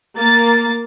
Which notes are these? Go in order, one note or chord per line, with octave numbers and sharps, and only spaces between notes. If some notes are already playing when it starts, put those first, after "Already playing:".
A#3 A6